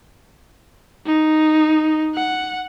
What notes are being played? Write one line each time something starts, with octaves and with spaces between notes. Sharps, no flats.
D#4
F#5